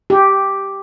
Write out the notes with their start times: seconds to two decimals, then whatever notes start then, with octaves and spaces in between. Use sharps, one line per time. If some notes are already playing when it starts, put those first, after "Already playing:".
0.10 G4